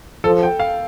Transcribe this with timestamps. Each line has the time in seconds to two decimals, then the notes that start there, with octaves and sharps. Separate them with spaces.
0.24 F3 A4
0.43 G5
0.60 F5